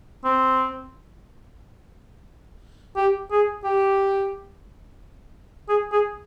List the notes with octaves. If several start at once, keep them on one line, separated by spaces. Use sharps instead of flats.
C4
G4
G#4
G4
G#4
G#4